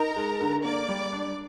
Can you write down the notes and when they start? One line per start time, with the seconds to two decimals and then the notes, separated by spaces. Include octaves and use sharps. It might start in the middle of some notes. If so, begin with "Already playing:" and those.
Already playing: D#4 A#4 A#5
0.16 G#3
0.40 D3
0.64 A#3 D5 D6
0.89 G3
1.13 D4